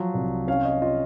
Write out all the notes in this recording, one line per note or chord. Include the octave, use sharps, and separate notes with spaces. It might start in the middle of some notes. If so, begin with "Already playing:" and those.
Already playing: F3 F#3
C2
C#4 F5
D#5
F4 D#5